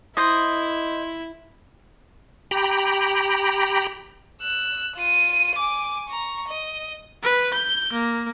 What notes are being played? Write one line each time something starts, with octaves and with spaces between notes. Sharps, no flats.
E4 C5 D#5
G4 G5 A#5 B5
E6 F#6
F4 D#7
G#5 D6
A#5 C#6
D#5
B4
G6
A#3